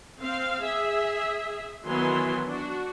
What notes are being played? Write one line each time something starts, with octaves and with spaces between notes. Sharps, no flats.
C4 F5
G#4 E5
D#3 E3 F#3 B3 G#5 C6
D4 F#4